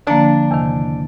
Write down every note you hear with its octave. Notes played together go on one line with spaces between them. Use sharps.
D3 F3 A#3 D4
E2 C3 D#3